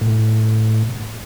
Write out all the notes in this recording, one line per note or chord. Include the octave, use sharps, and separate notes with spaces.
A2